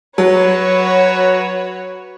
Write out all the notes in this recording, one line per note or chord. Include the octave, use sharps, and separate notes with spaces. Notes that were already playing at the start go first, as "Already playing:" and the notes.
F#3 F#4 B4 C#5